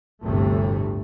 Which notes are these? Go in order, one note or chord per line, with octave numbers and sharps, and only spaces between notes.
G1 D2 A2 C3 A3